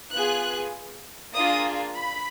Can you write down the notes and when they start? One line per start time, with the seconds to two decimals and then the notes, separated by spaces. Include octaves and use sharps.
0.13 B3 F4 G#4 F#6
1.34 A#3 D4 F4 G#4 D#6
1.96 B5